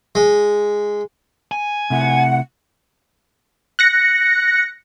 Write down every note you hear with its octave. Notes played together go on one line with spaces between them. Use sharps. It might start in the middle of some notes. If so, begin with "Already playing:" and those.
G#3
G#5
C3 A3 E4 F#5
F#6 A#6 C#7